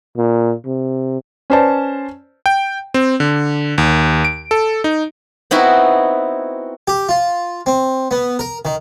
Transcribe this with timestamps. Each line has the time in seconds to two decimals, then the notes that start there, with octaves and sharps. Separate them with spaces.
0.17 A#2
0.67 C3
1.50 C#4 B4 C5 D5 A5
2.46 G5
2.94 C4
3.20 D3
3.78 D#2
4.25 D7
4.51 A4
4.84 D#4
5.51 B3 C4 D#4 E4 F#4
6.88 G4
7.09 F4
7.66 C4
8.11 B3
8.39 A#4
8.65 D#3